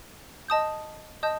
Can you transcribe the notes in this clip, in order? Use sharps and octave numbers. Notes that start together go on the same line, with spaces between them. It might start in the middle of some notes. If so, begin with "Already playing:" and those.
D#5 A5 D#6 G6
D#5 A5 D#6 G6